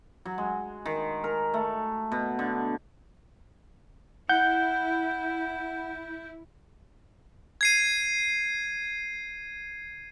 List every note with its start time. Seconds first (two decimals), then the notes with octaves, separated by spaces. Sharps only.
0.25 F#3
0.38 G#3
0.85 D#3
1.24 A#4
1.54 A3
2.12 B2
2.39 D3
4.29 E4 F#5 G6
7.61 G#6 C7 D#7